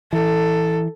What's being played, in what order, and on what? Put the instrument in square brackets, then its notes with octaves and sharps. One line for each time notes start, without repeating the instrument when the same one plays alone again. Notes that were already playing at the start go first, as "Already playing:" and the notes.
[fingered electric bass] E3 [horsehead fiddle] A4